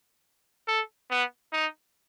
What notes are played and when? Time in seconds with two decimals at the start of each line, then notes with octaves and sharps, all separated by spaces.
0.67 A4
1.10 B3
1.53 D#4